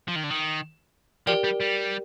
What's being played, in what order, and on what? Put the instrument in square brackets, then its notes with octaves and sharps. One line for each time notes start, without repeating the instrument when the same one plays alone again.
[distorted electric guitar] F3
D#3
D3
D#3
[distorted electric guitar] F3 [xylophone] G4 A#4 D5 G5
[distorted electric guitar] G3
G3